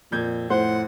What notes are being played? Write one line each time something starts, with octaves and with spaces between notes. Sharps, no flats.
F2 A#2 G6 G#6
A2 C5 F#5